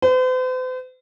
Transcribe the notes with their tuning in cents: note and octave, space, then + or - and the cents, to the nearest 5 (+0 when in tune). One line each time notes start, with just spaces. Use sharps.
C5 -45